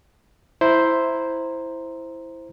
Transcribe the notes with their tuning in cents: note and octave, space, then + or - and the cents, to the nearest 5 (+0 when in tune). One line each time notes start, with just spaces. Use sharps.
E4 +0 C5 +0 A#5 +0